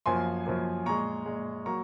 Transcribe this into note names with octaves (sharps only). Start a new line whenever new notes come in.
F#2 F3 A#3 G#5 C6
F#2 F3 A#3
A#2 G#3 A#5 C#6
A#2 G#3
F#3 A#3 A#5 C#6